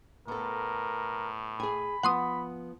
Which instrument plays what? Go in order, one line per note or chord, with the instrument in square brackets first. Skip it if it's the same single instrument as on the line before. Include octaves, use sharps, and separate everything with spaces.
[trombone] A2 [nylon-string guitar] B3 A4 [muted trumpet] A#4
[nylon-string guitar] G#4 G#5 [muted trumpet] B5
[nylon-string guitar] F3 B3 [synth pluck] F#5 C6 D#6